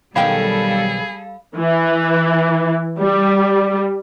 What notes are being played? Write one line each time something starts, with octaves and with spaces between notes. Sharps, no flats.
B1 D#3 G3 G#4 A4 F5 G5 B5
E3
G3